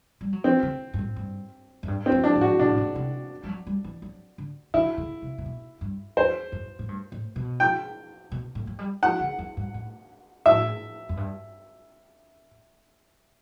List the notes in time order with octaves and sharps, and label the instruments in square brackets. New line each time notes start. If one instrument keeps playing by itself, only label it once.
[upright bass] G3
F#3
[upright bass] E3 [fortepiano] C4
[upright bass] D3
G2
A2
G2
F#2
G2
[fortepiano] C4
[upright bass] F#2
[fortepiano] D4
[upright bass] A2
[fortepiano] F#4
[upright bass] B2 [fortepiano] D4
[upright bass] A2
B2
C3
G3
F#3
G3
E3
F#3
D3
[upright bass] D3 [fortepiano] E4
[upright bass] D3
C3
C3
B2
G2
[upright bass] E2 [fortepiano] C5
[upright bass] F#2
A2
G2
A2
B2
[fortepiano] G5
[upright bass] B2
A2
F#3
G3
[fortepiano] F#5
[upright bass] D3
F#2
G2
A2
[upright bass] A2 [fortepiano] E5
[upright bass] F#2
G2